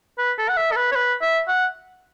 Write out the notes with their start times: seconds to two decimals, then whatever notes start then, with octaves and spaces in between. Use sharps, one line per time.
0.18 B4
0.38 A4
0.49 F#5
0.57 E5
0.72 A4
0.76 B4
0.92 C#5
0.96 B4
1.21 E5
1.47 F#5